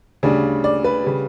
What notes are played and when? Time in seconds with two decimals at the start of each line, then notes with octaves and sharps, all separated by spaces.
0.23 D2 C#3 G3 D4
0.64 D5
0.84 B4
1.04 C#3 G3